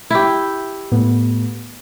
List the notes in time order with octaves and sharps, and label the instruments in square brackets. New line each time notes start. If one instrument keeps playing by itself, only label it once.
[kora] E4 G4
[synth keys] A2 B3